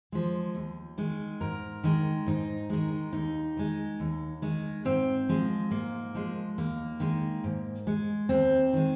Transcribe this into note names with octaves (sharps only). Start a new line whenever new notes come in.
F3 G#3
D#2
D#3 G#3
G#2 A#4
D#3 G#3
G#2 D#4
D#3 G#3
D#2 D#4
D#3 G#3
D#2
D#3 G#3
G#2 C4
F3 G#3
G#2 A#3
F3 G#3
D#2 A#3
D#3 G#3
G#2
G#3
D#2 C4
D#3 G#3